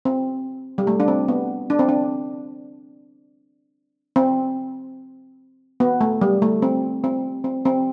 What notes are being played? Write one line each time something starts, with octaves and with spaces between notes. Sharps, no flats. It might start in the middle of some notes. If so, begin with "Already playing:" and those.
C4
G3
A3
D4
C4
B3
D4
C4
D4
C4
B3
A3
G3
A3
C4
C4
C4
C4